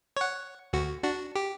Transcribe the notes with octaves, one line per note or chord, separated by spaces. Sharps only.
C#5 F#5
D2 F#4
D4 F#4
G4